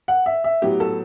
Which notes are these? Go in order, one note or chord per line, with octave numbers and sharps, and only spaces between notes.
F#5
E5
E5
A2 F#3 B3 G4
A4